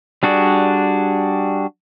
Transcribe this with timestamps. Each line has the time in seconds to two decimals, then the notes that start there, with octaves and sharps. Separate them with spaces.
0.23 G3 D4 F#4 G#4